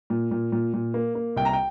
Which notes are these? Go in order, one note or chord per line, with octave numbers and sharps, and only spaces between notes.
A#2
A#2
A#2
A#2
A#3
A#3
C2 G5
A#5
G5